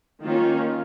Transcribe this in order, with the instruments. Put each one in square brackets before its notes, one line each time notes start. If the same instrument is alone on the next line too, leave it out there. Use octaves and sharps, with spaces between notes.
[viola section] D#3 A#3 C#4 F4